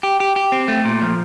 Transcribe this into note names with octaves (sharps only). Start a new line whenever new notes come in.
G4
G4
G4
C4
A3
A#2
F3